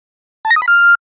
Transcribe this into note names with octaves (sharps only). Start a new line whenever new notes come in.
A5
A#6
D#6
B5
F6